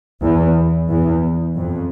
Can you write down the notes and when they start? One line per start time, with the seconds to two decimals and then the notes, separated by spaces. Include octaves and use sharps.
0.23 E2
0.89 E2
1.57 F2